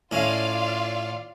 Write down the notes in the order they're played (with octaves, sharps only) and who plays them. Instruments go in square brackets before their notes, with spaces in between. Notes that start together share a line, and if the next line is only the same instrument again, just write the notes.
[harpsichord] A2 C#4 [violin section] F4 D5 F5